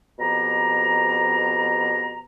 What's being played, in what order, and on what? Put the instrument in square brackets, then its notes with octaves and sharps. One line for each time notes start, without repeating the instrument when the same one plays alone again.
[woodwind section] F2 B2 G4 A#5